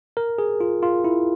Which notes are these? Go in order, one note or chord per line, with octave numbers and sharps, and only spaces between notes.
A#4
G#4
F4
F4
E4